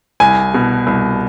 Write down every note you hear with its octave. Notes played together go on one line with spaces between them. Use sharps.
C2 G#5
B2
C2